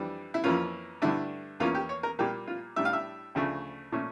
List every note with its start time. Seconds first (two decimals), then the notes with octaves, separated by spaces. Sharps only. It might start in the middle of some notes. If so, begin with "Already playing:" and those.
Already playing: F2 E3 G3 D4
0.34 E4
0.44 F2 E3 A#3 C#4 F4
1.02 G2 D3 A3 D4 E4
1.60 E2 E3 A#3 C#4 F4
1.75 G4
1.89 C#5
2.03 A#4
2.19 A#2 G3 A#3 G4
2.47 F4
2.76 A2 G3 D4 E5
2.85 F5
2.93 E5
3.35 D2 C#3 F3 A3 D4
3.92 A#2 A3 C#4